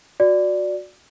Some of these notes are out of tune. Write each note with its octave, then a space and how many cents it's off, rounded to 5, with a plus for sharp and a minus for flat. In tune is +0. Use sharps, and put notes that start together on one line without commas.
F#4 -20 D5 +0